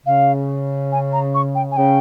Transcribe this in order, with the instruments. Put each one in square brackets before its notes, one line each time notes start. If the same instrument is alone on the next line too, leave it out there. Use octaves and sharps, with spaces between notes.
[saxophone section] C#3 [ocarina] F5
[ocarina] G#5
A#5
C#6
G5
G#5
[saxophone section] C#3 [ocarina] G5